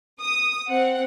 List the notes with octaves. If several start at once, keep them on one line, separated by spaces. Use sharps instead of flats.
D#6
C4 F#5